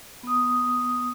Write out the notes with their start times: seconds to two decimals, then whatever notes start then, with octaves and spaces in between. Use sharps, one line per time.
0.23 B3 D#6